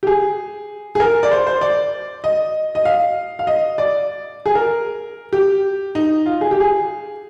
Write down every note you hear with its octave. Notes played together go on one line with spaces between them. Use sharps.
G4
G#4
G#4
A#4
D5
C5
C5
D5
D#5
D#5
F5
F5
D#5
D5
G#4
A#4
G4
D#4
F4
G#4
G4
G#4